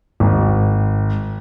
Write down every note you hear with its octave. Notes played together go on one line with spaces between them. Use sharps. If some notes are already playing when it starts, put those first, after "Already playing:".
G#1